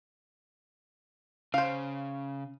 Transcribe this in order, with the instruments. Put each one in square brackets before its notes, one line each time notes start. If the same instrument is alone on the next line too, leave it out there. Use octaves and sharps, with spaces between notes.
[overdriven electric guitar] C#3 [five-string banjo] C5 F5